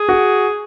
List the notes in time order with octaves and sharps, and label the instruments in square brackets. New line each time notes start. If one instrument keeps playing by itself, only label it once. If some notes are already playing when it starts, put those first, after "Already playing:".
Already playing: [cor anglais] G#4
[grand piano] F#4